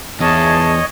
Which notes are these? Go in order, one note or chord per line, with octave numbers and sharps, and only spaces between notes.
E2 D#4 G#4 C#5 D#5 A5